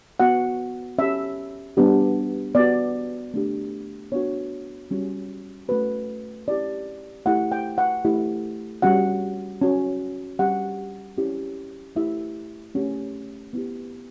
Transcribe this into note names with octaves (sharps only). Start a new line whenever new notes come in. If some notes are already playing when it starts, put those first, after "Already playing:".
B3 F#4 F#5
C#4 G4 E5
G3 B3 D4 G4
B3 F#4 D5
A3 D4 G4
B3 D4 F#4 C#5
G3 C#4 F#4
A3 C#4 F#4 B4
C#4 E4 G4 D5
A3 E4 G4 F#5
G5
F#5
A3 E4 G4
G3 C#4 F#4 F#5
C#4 F#4
G3 C#4 G4 F#5
C#4 E4 G4
A3 E4 G4 E5
A3 C#4 G4
B3 E4 G4